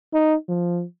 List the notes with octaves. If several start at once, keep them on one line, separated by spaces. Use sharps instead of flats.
D#4
F3